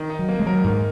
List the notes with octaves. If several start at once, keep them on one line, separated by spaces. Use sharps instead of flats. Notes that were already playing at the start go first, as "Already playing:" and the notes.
Already playing: D#3
D#4
F#3
A#3
G#3
F#3 A#4
G#2 D#3